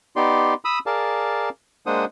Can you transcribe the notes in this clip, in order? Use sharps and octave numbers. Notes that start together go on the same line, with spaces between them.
B3 D#4 G4 D5 C6
B5 D#6 E6
G#4 A#4 D5 F5 A5
G#3 A#3 D4 C5 F#5 D#6